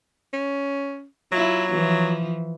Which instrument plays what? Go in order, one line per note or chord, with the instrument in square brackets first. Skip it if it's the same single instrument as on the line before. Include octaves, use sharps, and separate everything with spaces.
[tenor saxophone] C#4
[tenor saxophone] F#3 [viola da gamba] E4 F4
[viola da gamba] E3 F3